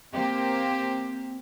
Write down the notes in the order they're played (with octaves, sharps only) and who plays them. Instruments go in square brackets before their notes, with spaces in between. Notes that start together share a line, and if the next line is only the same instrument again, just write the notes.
[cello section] A#3 G4 C5 [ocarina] C4